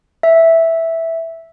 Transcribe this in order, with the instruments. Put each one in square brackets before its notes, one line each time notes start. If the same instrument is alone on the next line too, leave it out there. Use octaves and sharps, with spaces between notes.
[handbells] E5